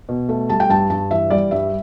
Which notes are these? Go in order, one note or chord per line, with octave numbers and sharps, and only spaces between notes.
B2
A3
G3 A5
G5
G2 A5
G2 A5
E3 E5
G3 D5
G2 E5